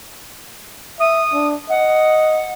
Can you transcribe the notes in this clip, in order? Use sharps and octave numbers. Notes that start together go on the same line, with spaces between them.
E5 D#6
D4
D#5 F#5